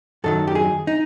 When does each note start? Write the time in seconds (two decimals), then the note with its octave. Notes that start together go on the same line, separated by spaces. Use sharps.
0.24 F#2 D#3 F#3 A4
0.48 G4
0.55 G#4
0.87 D#4